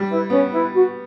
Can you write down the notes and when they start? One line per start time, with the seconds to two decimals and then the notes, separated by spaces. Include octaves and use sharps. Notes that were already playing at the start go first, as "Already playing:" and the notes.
Already playing: G3
0.09 E4 B4
0.30 B3 C#4
0.51 E4 B4
0.73 F#4